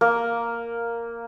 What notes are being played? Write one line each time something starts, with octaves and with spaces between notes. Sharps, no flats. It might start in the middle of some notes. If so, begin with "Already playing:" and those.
A#3